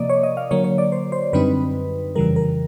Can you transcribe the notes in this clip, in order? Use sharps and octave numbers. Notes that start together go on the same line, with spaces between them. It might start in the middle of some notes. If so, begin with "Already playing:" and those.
Already playing: C3 F3 A#3 D5 D#5
C#5
D#5
F5
D3 F#3 A#3 C#5
C#5
D5
C5
C5
F#2 D3 G3 C4 D#4 B4
F2 C#3 E3 G3 A#4
A#4